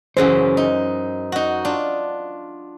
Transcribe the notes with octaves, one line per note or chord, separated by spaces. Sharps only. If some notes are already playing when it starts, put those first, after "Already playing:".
F#2 C#3 E3 C5
D#4
D#4 F#4
D4 F4